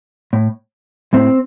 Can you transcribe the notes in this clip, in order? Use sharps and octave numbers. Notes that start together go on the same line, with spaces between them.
A2
A2 C4